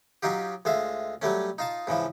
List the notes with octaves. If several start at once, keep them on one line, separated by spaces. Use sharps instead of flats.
F#3 C#4 D#4 F4 G4
D2 G#3 F4 E5
F#3 G3 A3 C#4
D#4 F4 A5
G#2 C#3 E3 F3